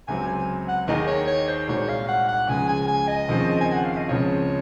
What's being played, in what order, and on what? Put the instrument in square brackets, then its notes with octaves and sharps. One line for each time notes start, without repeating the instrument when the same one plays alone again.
[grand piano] C#2 C3 F#3 C4 [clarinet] G#5
[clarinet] G#5
F#5
[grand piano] D#2 D#3 A#3 D#4 G#4 [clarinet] D#5
[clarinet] C#5
C#5
C5
[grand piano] C2 A#2 G#3 D#4 F#4 [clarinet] C#5
[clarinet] F5
F#5
F#5
[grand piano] C#2 C#3 F3 G#3 [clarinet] G#5
[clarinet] G#5
G#5
D#5
[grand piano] D#2 C#3 F3 C4
[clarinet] G#5
F#5
F5
D#5
[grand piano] C#2 C#3 F3 C4 F4 [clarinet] C#5